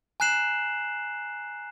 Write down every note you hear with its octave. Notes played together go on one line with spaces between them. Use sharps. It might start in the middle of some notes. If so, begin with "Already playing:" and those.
G#5 A#5 F#6 C7 E7 F#7